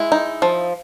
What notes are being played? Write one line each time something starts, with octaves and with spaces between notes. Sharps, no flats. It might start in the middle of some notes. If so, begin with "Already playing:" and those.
Already playing: G#3 E4
D#4
F3